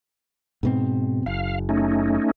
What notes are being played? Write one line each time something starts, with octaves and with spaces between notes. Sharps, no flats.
G#2 B2 C4
F#1 F5
A3 C#4 D#4